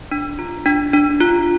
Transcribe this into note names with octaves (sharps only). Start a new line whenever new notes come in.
D4
F4
D4
D4
F4